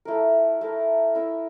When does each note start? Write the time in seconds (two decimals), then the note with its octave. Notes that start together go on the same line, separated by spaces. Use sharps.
0.05 A3 E4 A#4
0.61 A3 E4 A#4
1.15 E4 A#4 E5